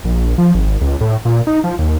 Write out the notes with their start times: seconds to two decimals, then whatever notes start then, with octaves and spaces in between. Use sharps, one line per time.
0.04 A#1
0.38 F3
0.55 G#1
0.81 C#2
1.01 A2
1.25 A#2
1.47 D#4
1.64 F3
1.79 D#2